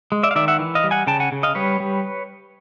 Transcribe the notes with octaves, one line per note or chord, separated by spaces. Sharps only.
G#3
D5 E5
F5
D#3 D5 E5
E5 F#5
E3
D#5 F5
G3
F#5 G#5
C#3 G5 A5
F#5 G#5
C#3
D#5 F5
G3 B4 C#5
G3